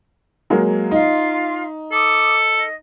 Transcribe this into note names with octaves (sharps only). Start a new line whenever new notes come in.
F#3 G#3 A#3
D#4 F4 F5 C6
A4 D6 D#6
D#5